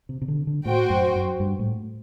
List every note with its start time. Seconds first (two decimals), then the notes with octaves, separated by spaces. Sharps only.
0.09 C3
0.22 C3
0.28 D3
0.47 D3
0.65 A2 F#4 C5 G5
0.90 F#2
1.15 F#2
1.40 G2
1.59 A2